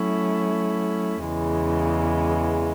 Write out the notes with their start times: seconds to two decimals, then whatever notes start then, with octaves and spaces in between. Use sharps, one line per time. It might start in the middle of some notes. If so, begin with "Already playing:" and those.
Already playing: F#3 A3 C#4 E4
1.27 E2 C#3 E3 G#3